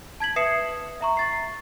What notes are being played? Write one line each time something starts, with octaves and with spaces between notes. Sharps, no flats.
A5 G#6 B6 F#7
B4 E5 D#6 C7 C#7 E7
E5 A#5 C#6
C#6 A6 C7